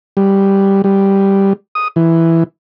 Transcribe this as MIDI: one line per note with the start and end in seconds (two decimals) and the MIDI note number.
0.17 0.82 55
0.84 1.53 55
1.75 1.88 87
1.96 2.44 52